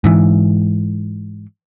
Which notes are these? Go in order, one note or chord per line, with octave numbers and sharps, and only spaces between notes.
G#2 E3